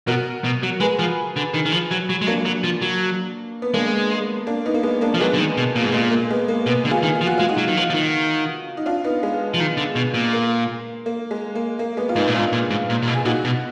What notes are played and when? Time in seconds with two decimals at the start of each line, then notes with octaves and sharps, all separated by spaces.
0.07 B2 F#4 A#4
0.44 B2
0.63 F#3
0.80 G#3 G#4 B4
0.99 F3
1.36 D3
1.54 D#3
1.66 D#3
1.72 F3
1.91 F#3
2.10 F#3
2.22 G#3
2.27 F#3 A#3 D4
2.46 F#3
2.64 F3
2.82 F#3
3.62 B3
3.74 G#3 A#3 D4
4.47 A#3 D4
4.66 B3 D#4
4.74 A#3
4.83 G#3 B3
5.01 A#3 D4
5.14 F3 A#3
5.20 F#3 G#3 B3
5.34 D3
5.38 D#3
5.57 B2
5.75 A#2
5.83 G#2
5.91 A#2 G#3
6.11 A#3
6.30 G#3 B3
6.48 A#3
6.66 B2 G#3 B3
6.85 D3
6.91 F4 G#4
7.03 D#3
7.15 G#4
7.21 F3
7.27 F#4
7.38 G#3 F4
7.49 D#4 F#4
7.58 F#3
7.68 D#3
7.77 F3
7.90 F3
7.94 D#3
8.77 D#4
8.86 D4 F4
9.04 B3 D#4
9.23 G#3
9.54 F3
9.60 D#3
9.77 D3
9.96 B2
10.14 A#2
10.33 A#3
11.06 A#3
11.31 G#3
11.55 A#3
11.79 A#3
11.97 G#3 B3
12.09 F4
12.16 G#2 B3 D#4
12.28 A#2
12.34 G#2 D4 F4
12.53 A#2
12.70 G#2
12.90 A#2
13.02 A#2
13.08 B2
13.14 G#4
13.25 A#2 D#4 F#4
13.45 B2